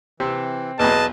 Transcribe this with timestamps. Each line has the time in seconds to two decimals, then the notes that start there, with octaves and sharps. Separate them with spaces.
0.20 C3 E3 C4
0.79 B1 E2 G#4 B4 D#5 A5